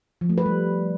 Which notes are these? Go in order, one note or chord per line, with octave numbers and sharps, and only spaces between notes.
F3
A3
B4
G3